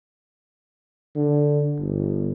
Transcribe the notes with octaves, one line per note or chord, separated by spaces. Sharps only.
D3
G1